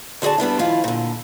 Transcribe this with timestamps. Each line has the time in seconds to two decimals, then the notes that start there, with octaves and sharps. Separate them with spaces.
0.22 D3 F#4 G#4 D5 A5
0.38 G3 B3 D4 E4
0.59 D2 D#3 F3 E4 F4 F5
0.84 A#2 D3